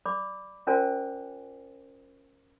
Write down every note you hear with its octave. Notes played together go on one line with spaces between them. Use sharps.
D5 B5 D6
C#4 F4 A#4 C5 D5 G#5